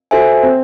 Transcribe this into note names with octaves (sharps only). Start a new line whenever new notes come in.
F#4 A4 C5 E5 G#5
C4